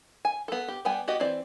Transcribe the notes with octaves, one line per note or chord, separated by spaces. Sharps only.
G#5
B3 A4
G4
G3 B3 G5 G#5
B3 F#4 G4 D#5
E3 C4 D5